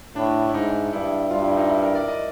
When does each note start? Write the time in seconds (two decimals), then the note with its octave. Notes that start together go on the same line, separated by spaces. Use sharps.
0.16 A2 D4
0.49 E4
0.54 G#2 D#4
0.93 G2 E4
1.31 G2 F4
1.44 E4
1.57 D#4
1.70 E4
1.82 A#4
1.95 D5
2.08 D#5